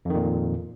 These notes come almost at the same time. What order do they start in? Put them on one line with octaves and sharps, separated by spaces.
F2 D#3 A#2